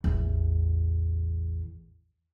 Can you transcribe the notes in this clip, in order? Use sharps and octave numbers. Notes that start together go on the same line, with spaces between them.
A1 E2